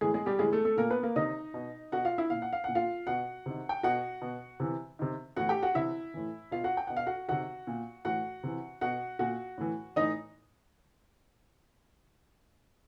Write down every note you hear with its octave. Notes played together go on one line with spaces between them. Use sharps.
A2 E3 G#3 G#4
G#3 G#4
G3 G4
A2 E3 G#3 G#4
A3 A4
A3 A4
A#2 A#3 A#4
B3 B4
A#3 A#4
C3 D#3 D#4 D#5
B2
B2 F#4 F#5
F4 F5
E4 E5
A#2 F5
F#5
F5
A#2 F#5
F4 F5
B2 F#4 F#5
C3 D#3
G5
B2 F#4 F#5
B2
C3 E3
C3 D#3
A2 E3 F#4 F#5
G4 G5
F#4 F#5
C3 E3 E4 E5
A2 E3
B2 F4 F5
F#4 F#5
G5
B2 F#5
F5
F#4 F#5
C3 D#3 F#4 F#5
A#2
A2 E3 F#4 F#5
C3 E3
B2 F#4 F#5
A#2 F#4 F#5
A2 E3
A2 E3 D#4 D#5